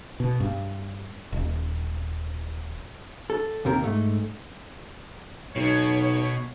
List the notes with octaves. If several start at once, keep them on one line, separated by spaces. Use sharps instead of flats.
B2
G2
D#1
A4
D#2 C3 A#4
G#2 A3
B1 B2 C#5